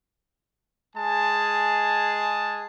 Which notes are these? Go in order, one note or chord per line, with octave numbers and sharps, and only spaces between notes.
G#3 G#4 G#5 A5